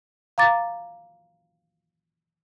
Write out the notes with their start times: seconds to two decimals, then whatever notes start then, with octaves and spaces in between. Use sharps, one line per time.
0.38 F5 A#5 D6 A6